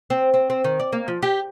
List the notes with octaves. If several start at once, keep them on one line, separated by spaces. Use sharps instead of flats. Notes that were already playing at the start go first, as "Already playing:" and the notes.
C4
C4
C4
D#3
D5
A#3
F3
G4